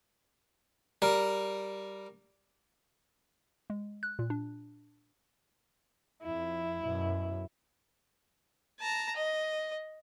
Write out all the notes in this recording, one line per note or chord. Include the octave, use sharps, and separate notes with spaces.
G3 A#4
G#3
F#6
A#2
D4
F2 E4
F#2 B2
A5 A#5
D#5